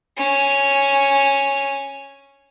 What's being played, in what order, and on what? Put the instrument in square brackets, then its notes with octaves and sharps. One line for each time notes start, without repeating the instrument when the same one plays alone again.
[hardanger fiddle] C#4 G#5